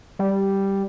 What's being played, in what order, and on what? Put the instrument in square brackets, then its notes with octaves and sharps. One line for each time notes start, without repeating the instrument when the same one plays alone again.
[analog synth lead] G3